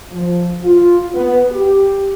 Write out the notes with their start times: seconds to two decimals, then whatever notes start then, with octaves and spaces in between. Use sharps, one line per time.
0.12 F3
0.64 F4
1.13 B3
1.51 G4